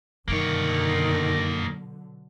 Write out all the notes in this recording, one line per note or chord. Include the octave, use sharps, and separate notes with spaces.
F#2 B2 D3 D#3 F#3 A#3 C#5